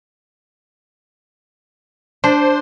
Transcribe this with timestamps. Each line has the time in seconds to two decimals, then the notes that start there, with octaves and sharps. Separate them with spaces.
2.24 D4 C5